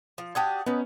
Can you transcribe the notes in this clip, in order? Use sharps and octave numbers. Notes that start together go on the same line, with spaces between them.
F3
D4 F#4 G4 A5 D#6 G#6
B3 C#4 D#4 B4